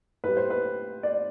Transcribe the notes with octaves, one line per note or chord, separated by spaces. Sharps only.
A2 G3 B4
C5
B4
D5